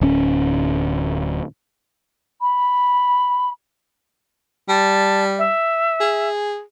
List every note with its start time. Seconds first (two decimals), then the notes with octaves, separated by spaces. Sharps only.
0.01 D1 C#4
2.41 B5
4.69 G3 A5
5.39 E5
6.00 G#4